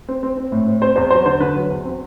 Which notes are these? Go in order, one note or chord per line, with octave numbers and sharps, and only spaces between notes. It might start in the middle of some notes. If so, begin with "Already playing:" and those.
C4
C4
C4
A2
C4
C4 C5
E2 C5
F#3 C5
D3 C5
D3 B4
F#3
E2
C4